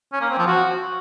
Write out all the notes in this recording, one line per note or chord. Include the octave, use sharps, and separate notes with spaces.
C#4
A#3
C4
F3
F#4